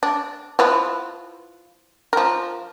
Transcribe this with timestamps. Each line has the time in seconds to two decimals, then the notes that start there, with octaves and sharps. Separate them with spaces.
0.03 D4
0.59 F3 E4 B4
2.13 F3 A#4